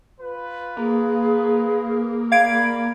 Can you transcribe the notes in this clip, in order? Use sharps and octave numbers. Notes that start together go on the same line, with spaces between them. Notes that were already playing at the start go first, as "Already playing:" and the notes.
F4 B4
A#3 G#4
A#4 D5 F5 B5 G#6 D7